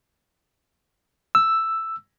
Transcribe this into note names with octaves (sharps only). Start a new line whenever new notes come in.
E6